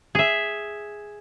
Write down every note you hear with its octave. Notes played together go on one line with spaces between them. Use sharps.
G#4 E5